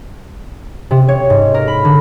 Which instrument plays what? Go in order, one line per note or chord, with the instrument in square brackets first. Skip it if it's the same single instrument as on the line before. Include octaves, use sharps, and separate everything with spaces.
[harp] C3
C#5
G#2
A#4
B5
D3